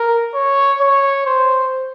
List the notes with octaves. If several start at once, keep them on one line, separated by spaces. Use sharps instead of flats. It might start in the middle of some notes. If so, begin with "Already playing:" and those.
Already playing: A#4
C#5
C#5
C5